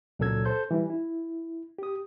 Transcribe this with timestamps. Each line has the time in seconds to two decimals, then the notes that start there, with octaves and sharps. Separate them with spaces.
0.19 C#2 A#2 F#3 A4 E6 G#6
0.45 A4 C5 C6 G6
0.71 E3 G3
0.90 E4
1.79 G4 D#6